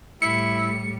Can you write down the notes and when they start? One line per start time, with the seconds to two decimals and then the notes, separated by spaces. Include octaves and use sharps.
0.22 A2 G3 E4 C#7